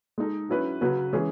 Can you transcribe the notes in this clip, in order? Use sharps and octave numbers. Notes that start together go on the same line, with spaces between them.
G#3 D#4 A4
F#3 C#4 E4 B4
C#3 F#3 C#4 F#4 B4
E3 G#3 C#4 G#4